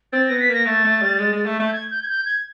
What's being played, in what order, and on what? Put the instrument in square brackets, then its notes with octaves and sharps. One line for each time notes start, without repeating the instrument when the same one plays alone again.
[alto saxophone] C4 [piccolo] A6
[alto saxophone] B3 [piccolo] A#6
[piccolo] B6
[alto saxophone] A#3 [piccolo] A#6
[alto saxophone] A3 [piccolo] A6
[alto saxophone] A3
G3
G#3
G#3
A3
A3
[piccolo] G6
G#6
G6
G#6
G6
G#6